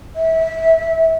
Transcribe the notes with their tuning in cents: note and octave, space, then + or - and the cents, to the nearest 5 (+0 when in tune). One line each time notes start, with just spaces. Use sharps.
E5 -20